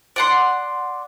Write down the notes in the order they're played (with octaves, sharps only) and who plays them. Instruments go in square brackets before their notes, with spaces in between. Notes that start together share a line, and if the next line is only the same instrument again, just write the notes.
[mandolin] D5 F#5 C6